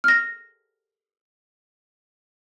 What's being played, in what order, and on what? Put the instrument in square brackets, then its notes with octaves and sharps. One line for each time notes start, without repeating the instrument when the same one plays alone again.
[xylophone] F6 A#6